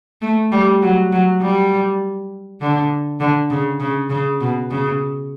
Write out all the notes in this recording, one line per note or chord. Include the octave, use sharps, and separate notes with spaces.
A3
G3
F#3
F#3
G3
D3
D3
C#3
C#3
C#3
B2
C#3